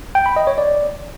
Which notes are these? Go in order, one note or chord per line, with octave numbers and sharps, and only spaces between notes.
G5
B5
D#5
C#5
D5